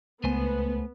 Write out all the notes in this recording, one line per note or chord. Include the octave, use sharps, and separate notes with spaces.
C#2 A3 B3 C5 G#5